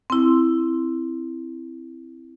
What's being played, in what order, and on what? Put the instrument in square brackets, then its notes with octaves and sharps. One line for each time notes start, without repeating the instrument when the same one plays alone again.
[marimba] C4 E4